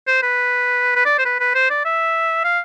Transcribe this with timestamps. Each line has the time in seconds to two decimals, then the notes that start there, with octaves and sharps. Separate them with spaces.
0.07 C5
0.23 B4
0.95 B4
1.05 D5
1.18 C5
1.25 B4
1.40 B4
1.55 C5
1.70 D5
1.85 E5
2.44 F5